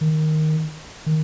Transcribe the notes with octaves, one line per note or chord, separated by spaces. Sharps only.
D#3
D#3